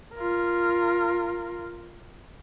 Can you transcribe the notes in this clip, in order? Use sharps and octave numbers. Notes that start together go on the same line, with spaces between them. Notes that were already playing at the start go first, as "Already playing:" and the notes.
F4 A#4